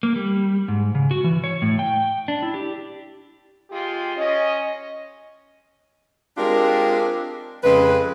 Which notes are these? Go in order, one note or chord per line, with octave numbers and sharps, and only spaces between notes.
A#3
G3
G#2
C#3
F#4
E3
C#5
A2
G5
D4
E4
G4
G#3 F4 G4
C#4 D#5
G#3 C4 D4 F4 G4 A#4
F2 C#3 G#3 B4